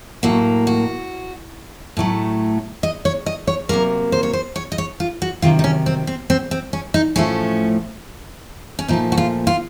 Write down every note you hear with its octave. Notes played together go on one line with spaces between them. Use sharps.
A2 F#3 A#3 F#4
F#4
A2 F#3 A3
D#5
C#5
D#5
C#5
C3 F#3 A#3 A#4
C5
C#5
C5
C#5
D#5
C#5
F4
F#4
C3 D#3 F#3 F4
D#4
C#4
C4
C4
C4
C4
C#4
D#4
A2 F3 A3 C#4
C#4
A#2 F3 A3 D#4
F#4
F4
F4